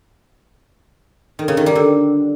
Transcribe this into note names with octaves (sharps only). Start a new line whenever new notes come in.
D#3
C#3
D#3
G3
D3